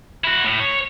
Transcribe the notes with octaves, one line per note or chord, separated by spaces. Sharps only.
E4 F#4
A2
C#5